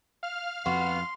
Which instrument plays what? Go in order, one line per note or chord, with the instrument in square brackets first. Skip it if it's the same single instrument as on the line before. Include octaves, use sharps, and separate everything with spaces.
[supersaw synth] F5 F6
[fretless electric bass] F2 [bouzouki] B3 F#4 [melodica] C6